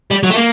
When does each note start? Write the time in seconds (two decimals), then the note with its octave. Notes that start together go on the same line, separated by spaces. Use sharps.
0.11 G3
0.23 F#3
0.30 A3
0.36 A#3